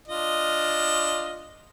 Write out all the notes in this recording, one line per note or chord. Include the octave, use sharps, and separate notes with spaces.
D4 F4 D#5